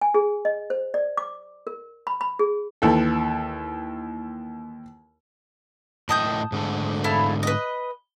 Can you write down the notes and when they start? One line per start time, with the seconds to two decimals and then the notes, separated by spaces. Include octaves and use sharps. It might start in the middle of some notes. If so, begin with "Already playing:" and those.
0.01 G#5
0.14 G#4
0.45 D#5
0.70 C5
0.94 D5
1.17 D6
1.67 A#4
2.07 B5
2.21 B5
2.39 G#4
2.82 D#2 E3 A4
6.09 A2 D#5 G5 A5 D#6 G6
6.52 G#2 D3 A3
7.04 E4 A4 F5
7.43 B4 D#5